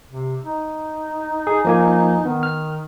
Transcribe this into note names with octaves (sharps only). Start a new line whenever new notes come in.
C3
D#4
G#4
F3 A#3 G#5
D#3 B3
F6